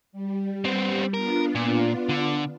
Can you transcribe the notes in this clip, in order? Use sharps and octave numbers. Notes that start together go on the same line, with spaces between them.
G3
B3 C4
B3 D4 F4 A#4
A#2
D3